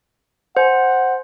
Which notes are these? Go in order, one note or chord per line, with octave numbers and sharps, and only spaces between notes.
C5 F#5 G#5